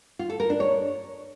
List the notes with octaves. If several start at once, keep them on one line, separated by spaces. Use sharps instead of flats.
F4
A4
A#4
D4
C#5